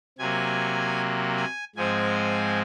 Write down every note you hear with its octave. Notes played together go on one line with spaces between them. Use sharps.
C3 F#3 A#3 G#5
G#5
G#2 F3 G#3 C4 G#5